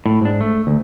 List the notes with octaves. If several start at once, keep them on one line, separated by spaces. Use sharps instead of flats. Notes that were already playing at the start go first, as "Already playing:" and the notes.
A2
G#2 D4
A3
D2